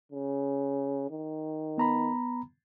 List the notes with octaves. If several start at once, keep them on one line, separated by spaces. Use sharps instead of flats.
C#3
D#3
B3 A#5 B5